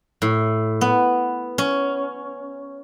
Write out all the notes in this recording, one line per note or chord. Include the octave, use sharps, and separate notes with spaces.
A2
B3
C#4